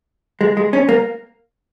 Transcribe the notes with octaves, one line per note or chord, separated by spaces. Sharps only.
G#3
G#3
C#4
A#3